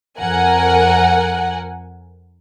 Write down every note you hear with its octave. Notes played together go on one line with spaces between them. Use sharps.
F2 A#4 F#5 G#5